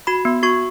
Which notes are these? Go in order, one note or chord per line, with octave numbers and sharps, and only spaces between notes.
F#4 B5
B3
F#4 C#6